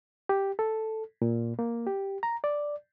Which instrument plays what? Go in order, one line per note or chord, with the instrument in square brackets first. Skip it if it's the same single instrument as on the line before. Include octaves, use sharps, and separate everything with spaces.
[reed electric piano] G4
A4
A#2
A#3
G4
A#5
D5